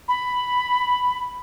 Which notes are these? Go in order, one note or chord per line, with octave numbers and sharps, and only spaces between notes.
B5